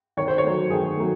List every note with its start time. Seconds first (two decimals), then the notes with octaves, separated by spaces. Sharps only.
0.17 D#3 C#5
0.28 C5
0.38 C#5
0.44 F#3 A3
0.70 D#3 G#4
0.97 F#3 A3